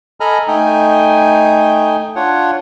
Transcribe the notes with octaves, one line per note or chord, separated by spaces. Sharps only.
A4 D#5 G#5 A#5 B5 F6
A3 D#4 G5 G#5 D#6
D4 F4 C#5 F#5